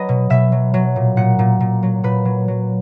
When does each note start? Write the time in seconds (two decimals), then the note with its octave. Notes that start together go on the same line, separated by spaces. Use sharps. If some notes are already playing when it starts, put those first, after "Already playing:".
Already playing: F#3 B4 D#5
0.09 B2
0.30 B2 E5
0.52 F#3
0.74 F#3
0.96 A#2
1.17 A#2 F#5
1.39 A#2
1.60 A#2
1.83 F#3
2.03 A#2 B4
2.25 F#3
2.48 F#3